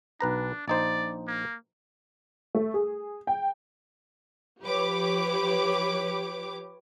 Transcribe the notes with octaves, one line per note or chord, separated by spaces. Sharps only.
B1 D4 B4 A#5
A#1 D#4 C5 D5
A#3
A3
G#4
G5
F3 G4 B4 C#5 D6